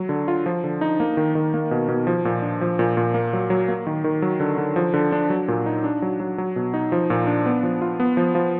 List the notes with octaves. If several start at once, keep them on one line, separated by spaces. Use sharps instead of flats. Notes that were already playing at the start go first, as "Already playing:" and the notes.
Already playing: F#3
D3
F4
F3
D3
D#4
A#3
D#3
D#3
A#3
B2
B2
F3
A#2
D4
F3
A#2
A#2
A#3
F#3
F#3
A#3
D#3
D#3
F#3
D3
D3
F3
D3
D4
F#3
A#2
D#4
D4
F#3
F#3
F#3
B2
D#4
F3
A#2
D4
B3
F3
F4
B3
F3
F3